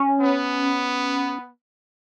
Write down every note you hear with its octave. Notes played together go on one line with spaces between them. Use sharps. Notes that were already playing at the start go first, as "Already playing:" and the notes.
Already playing: C#4
B3